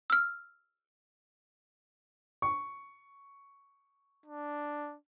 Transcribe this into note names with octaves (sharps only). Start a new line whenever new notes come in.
E6 F6
C#6
D4